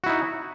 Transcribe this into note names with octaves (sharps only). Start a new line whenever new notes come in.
D#4 E4 F#4